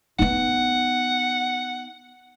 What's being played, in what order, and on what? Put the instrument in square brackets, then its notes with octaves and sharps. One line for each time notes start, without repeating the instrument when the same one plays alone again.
[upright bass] B3 D#4 [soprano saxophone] F#5